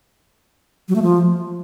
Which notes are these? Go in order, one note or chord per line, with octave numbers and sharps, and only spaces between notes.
F#3
A3
F3